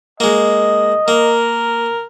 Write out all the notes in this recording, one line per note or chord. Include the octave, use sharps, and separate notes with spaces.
G#3 A#3 D#5
A#3 A#4